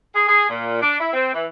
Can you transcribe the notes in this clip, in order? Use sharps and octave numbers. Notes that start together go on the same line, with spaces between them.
G#4
G#4
A#2
D4
E4
C4
E3